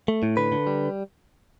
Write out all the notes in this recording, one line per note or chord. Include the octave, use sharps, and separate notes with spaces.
A3
A2
D3 B4
D3
G3